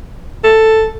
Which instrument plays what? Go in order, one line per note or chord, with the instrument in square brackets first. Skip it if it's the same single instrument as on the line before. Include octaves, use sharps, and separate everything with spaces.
[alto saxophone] A4